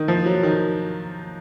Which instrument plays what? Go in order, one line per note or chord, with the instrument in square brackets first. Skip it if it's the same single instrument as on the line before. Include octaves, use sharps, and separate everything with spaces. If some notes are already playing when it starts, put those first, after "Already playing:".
Already playing: [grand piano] D#3
F3
F#3
D#3